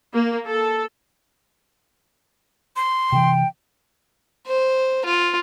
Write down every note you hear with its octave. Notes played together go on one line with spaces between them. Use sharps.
A#3
A4
C6
C3 D#3 E3 G5
C5
F4